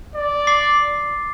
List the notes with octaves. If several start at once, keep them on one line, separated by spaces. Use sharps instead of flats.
D5
D6 A6 C7